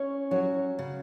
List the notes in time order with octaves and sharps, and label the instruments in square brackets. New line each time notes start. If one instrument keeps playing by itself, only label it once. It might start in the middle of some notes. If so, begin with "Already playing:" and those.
Already playing: [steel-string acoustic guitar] C#4 [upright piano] C#5
[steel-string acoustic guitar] F#3 [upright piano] C#5
[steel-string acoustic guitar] C#3